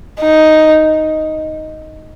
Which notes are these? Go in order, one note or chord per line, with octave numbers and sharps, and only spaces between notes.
D#4